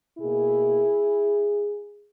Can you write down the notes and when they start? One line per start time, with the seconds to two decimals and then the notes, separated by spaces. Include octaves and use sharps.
0.18 B2 A#3 E4 G#4